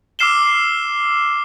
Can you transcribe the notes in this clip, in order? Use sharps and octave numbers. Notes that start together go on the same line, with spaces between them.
D6 E6 F6 C7 E7 G7